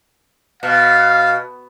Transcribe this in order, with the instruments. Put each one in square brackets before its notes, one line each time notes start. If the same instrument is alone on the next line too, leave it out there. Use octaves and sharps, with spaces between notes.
[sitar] B2 [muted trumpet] F5